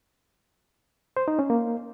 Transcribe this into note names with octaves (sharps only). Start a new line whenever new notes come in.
C5
D#4
C#4
A#3